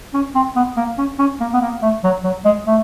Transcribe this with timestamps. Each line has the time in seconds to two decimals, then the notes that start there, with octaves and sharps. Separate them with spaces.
0.14 C#4
0.35 C4
0.56 B3
0.77 A#3
0.98 C#4
1.19 C#4
1.40 A#3
1.53 B3
1.62 A#3
1.82 A3
2.04 F#3
2.24 F#3
2.45 G#3
2.67 A3